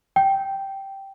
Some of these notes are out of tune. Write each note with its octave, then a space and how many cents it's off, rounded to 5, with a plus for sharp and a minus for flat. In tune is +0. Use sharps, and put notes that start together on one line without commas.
G5 -5